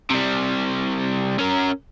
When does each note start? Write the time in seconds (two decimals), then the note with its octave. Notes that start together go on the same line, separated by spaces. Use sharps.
0.10 C3 G3
1.39 C#4 A#4